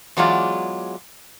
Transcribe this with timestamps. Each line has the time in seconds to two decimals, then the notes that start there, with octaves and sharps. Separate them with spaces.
0.17 E2 F#3 G#3 F4 D5